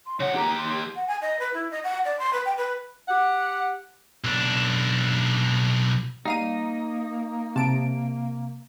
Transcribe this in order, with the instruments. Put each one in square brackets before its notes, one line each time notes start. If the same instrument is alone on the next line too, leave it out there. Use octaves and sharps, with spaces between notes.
[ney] C6
[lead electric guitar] C#3 F#5 [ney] C#5
[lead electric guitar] D#2 G4 [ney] A#5
[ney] C6
[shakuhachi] F#5
G#5
D#5
B4
E4
D#5
F#5
D5
C6
B4
G5
B4
[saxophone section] G4 F#5
[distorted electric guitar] B1 D4
[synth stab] G3 F5 D#7 [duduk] A#3 [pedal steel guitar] D#4
[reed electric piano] C3 [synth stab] A5 D7